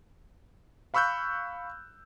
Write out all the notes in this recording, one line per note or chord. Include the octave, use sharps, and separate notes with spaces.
F5 B5 C#6 E6 F#6 G6